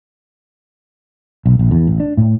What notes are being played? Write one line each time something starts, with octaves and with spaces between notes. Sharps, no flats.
B1
A#1
E2
A1
D4
A2